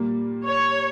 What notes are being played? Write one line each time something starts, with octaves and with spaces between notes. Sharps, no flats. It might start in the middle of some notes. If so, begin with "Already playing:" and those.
Already playing: A#2 G3 A#3
C#5